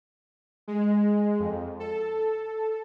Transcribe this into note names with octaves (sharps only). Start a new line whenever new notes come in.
G#3
F2
A4